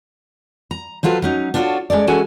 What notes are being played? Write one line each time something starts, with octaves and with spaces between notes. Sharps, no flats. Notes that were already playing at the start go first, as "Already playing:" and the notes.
A#5
F3 F#3 F4 A4 B4
F#3 C#4 D#4
D4 F4 F#4 G#4 A4 C#5
G#3 C#4 A4 D5
E3 G#3 C#4 F#4 A4 G#5